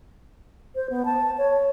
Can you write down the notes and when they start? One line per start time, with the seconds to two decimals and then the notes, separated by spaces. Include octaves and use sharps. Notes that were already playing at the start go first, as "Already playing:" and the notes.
0.75 C5
0.90 B3
1.06 A5
1.38 C#5